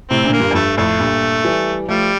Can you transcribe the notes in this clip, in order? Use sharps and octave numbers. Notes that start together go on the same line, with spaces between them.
A2 C3 C4
A#2 D3
A#3
G2
F2
G2 A3
F2 A2 A3
G2 A#2
E3 G3
F3 G3 A3